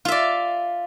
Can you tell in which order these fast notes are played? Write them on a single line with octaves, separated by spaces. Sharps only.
F4 E5 D5